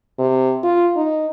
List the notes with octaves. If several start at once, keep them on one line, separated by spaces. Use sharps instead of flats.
C3
F4
D#4